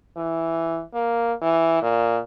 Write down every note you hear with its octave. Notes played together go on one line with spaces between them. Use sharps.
E3
A#3
E3
A#2